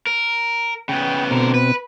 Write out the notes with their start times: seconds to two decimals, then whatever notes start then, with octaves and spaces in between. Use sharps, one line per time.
0.07 A#4
0.89 C#3 B3 G5
1.31 B2 D3 C4 A#4
1.54 B4